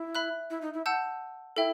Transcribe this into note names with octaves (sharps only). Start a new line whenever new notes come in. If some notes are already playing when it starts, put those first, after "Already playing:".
Already playing: E4
E5 B5 F#6
E4
D#4
E4
F#5 A5 E6 G6
E4 A4 E5 G5